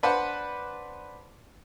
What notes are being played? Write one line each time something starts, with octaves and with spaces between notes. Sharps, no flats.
D4 B4 C5 F#5